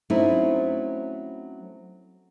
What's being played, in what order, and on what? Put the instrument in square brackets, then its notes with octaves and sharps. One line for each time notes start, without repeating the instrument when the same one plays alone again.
[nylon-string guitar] F#3 A3 C4 C#4 D#4 E4